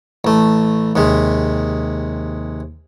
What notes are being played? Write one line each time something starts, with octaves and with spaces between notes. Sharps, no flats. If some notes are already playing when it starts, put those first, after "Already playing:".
A1 A3
D#2 C3 G#3